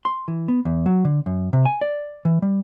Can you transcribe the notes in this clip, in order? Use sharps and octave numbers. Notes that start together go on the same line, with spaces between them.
C6
E3
B3
E2
F#3
D3
F#2
C3
G#5
D5
E3
G3